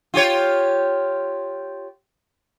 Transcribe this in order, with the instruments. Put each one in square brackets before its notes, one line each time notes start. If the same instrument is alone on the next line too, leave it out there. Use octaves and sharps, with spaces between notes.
[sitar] F4 G4 C#5